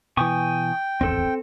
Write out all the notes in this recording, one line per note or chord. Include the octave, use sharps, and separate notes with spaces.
B2 E3 G5 G#5 C#6 D#6
D1 G#1 E2 C4 A4